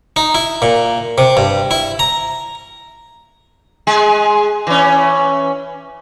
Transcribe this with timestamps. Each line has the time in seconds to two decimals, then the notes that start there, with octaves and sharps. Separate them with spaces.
0.16 D#4
0.35 E4
0.62 A#2
1.18 C3
1.37 G2
1.71 E4
1.99 A#5
3.87 G#3 G#4
4.67 E3 C#4